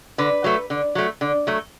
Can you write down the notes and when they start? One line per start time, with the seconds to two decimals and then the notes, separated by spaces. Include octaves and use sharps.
0.18 D3 B4
0.44 F#3 A3
0.70 D3
0.95 F#3 A3
1.21 D3
1.47 F#3 A3